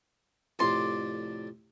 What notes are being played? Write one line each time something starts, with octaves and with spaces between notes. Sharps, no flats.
F2 A2 C3 D5 C6